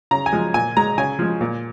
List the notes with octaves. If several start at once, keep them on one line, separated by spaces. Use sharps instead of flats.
C#3 A#5
G#5
F3 G#3
A#2 G#5
G#3 A#5
C#3 G#5
F3 G#3
A#2